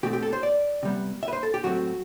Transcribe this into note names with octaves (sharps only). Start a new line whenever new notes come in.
B2 A3 C4 G4
G4
A4
C5
D5
C3 G3 B3
E5
B4
C5
A4
G4
A2 F#3 A3 C4 F#4